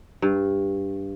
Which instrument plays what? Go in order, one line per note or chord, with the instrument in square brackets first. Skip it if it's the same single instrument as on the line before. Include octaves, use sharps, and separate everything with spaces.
[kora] G2